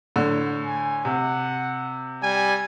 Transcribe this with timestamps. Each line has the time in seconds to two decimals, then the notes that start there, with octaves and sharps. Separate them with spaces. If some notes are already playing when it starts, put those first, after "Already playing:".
0.16 A2 D3
0.65 G#5
1.05 C3 F#5
2.23 G3 G#5